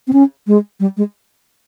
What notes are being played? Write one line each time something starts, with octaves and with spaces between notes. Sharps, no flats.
C4
C#4
G#3
G3
G#3